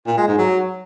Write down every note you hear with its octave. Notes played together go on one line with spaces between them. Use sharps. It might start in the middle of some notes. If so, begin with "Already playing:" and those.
A#2
G#3
G#2
F#3